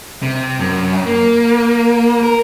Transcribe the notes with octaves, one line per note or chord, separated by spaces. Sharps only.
C3
F#2
A#3
A#4